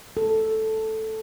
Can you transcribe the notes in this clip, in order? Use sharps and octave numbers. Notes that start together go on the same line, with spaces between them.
A4